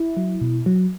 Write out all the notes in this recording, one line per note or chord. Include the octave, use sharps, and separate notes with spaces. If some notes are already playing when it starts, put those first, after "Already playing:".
Already playing: E4
F#3
B2
F#3